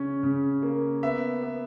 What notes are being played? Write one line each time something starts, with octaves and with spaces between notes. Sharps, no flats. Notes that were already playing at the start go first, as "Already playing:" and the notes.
Already playing: C#3 C#4
C#3
A#3
B3 E5
B3